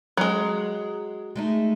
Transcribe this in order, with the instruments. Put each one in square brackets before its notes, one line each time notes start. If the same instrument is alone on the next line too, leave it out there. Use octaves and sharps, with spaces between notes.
[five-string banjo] F#3 G#3
[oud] G#3 A3 D#4